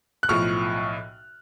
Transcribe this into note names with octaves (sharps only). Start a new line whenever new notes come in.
F#6
B1 A2 F3 C#6 F6